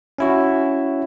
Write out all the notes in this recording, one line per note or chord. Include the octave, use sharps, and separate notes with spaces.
C#4 E4 F#4